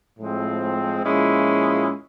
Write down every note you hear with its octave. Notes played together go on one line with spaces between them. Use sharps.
A2 F3 G#3 C4
A#2 F3 G#3 C#4 E4